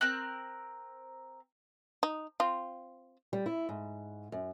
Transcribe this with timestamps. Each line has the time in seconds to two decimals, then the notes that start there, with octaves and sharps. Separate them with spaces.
0.01 C4 A#4 F#6
2.03 D#4
2.40 C4 F4
3.33 G3
3.46 E4
3.69 G#2
4.32 F#2